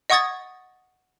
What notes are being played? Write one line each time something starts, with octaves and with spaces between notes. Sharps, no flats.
D#5 F#5 C#6 D#6 G#6 A6